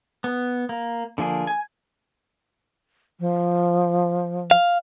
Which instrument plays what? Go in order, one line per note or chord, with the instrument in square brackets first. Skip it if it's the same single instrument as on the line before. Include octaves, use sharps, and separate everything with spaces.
[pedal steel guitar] B3
A#3
D3 F3 A#3 G#4
G#5
[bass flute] F3
[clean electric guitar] F5